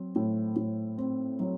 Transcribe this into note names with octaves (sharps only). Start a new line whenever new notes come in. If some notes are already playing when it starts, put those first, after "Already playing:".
Already playing: F#3 C4
A2
A2
C4
F#3